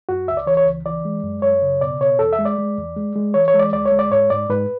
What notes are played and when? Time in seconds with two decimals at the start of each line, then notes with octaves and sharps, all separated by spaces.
0.09 F#2 F#4
0.28 C#2 E5
0.37 D5
0.47 E3 C#5
0.57 C#5
0.66 C#2
0.86 E3 D5
1.05 G#3
1.24 F#2
1.42 F#2 C#5
1.62 C#3
1.81 B2 D5
2.00 B2 C#5
2.19 E2 A4
2.33 E5
2.39 G#3
2.45 D5
2.58 G#3
2.78 E2
2.96 G#3
3.16 G#3
3.34 E3 C#5
3.48 C#5
3.54 G#3
3.60 D5
3.73 D2 D5
3.86 C#5
3.92 G#3
3.99 D5
4.11 G#2 C#5
4.30 G#2 D5
4.50 G#2 B4